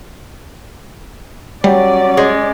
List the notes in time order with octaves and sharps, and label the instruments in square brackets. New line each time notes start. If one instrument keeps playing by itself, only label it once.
[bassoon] F#3 [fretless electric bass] G3 [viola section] C#4 D5
[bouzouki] G#3